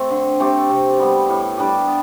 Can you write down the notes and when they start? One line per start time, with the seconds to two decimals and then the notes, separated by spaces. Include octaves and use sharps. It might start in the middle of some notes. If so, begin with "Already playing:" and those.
Already playing: A3 C4
0.10 D3
0.40 A3 C4 G4
0.69 C3
0.99 G3 B3
1.29 A2
1.57 G3 D4 G4
1.87 B3